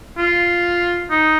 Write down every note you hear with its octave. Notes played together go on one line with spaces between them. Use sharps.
F4
D#4